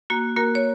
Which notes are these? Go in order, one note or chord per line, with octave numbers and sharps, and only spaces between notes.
A#3 F#4
A#3 F#4 A#4
C#5